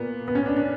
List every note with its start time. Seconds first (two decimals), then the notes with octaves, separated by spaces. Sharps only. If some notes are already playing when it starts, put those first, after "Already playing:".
Already playing: A#2 A#3 B3
0.28 B3
0.35 C#4
0.46 D4
0.57 D4